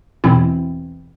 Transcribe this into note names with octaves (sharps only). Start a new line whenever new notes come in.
E2 B2 E3 C4 E4